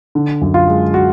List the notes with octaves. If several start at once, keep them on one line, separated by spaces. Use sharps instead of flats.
D3
F#2
F4
G#3
F#4